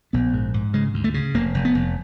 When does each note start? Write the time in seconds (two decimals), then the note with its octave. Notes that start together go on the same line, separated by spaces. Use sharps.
0.13 A#1 B3
0.34 G#2
0.54 G#2
0.73 C#3 G#3
0.94 D2
1.04 A3
1.14 C#3
1.34 F1 A#3
1.54 F1
1.65 B3
1.75 F1